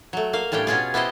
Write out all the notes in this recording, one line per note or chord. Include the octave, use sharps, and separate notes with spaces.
F#3 A3
A#3 F5
A2 G3 C#4 D4 G5
B2 C#4 F4 G#4
B3 E4 G4 C5 D#5